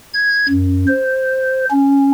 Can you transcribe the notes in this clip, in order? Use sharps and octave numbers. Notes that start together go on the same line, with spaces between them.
G#6
F#2
C5
C#4